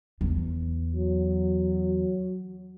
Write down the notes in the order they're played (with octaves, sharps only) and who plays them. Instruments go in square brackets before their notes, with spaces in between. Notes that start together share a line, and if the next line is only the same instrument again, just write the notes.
[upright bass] E2
[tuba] F#3